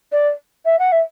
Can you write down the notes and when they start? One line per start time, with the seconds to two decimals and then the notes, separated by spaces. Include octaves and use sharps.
0.12 D5
0.65 E5
0.79 F#5
0.92 E5